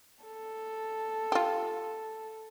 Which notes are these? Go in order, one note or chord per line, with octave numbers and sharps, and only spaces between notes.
A4
F4 G4